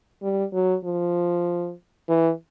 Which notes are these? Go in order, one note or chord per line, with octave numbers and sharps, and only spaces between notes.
G3
F#3
F3
E3